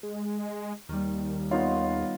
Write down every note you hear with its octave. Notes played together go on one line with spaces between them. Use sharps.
G#3
D#2 D#3 G3
B3 D#4 F4 C#5